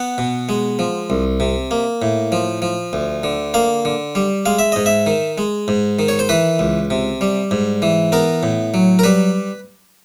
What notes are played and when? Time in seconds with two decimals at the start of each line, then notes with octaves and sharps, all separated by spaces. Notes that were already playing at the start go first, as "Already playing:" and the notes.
Already playing: B3 F#5
0.18 B2
0.49 G#3
0.79 F3
1.10 C2
1.40 C3
1.71 A#3
2.02 A2
2.32 F3
2.62 F3
2.93 D2
3.23 D3
3.54 A#3 F5
3.85 D3
4.15 G3
4.46 G#3 F5
4.59 E5
4.72 G#2 D#5
4.86 E5
5.07 D#3
5.38 G#3
5.68 G#2
5.99 D#3
6.08 C#5
6.19 C5
6.29 E3 B4
6.59 C#2
6.90 C3
7.21 G3
7.51 G#2
7.82 E3
8.12 B3 A#4
8.43 A2
8.74 F#3
8.99 A#4
9.04 G3 B4